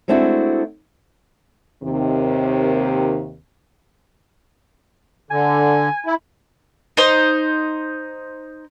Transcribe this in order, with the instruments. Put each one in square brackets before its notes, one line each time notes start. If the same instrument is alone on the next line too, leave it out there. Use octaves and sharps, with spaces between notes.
[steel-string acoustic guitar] G#3 A3 C4 D4 E4 F#4
[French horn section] D#2 C3 D#3
[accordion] D3 [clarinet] G#5
[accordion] E4
[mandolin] D#4 C5